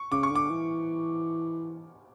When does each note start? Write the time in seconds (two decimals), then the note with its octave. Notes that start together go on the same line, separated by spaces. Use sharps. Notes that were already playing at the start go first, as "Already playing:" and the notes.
Already playing: C#6
0.11 C#3 D6
0.23 C#6
0.31 D3 D6
0.50 E3